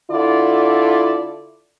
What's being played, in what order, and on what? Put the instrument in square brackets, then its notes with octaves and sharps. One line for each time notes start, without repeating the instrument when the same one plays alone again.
[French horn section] D3 E4 F4 A4 D5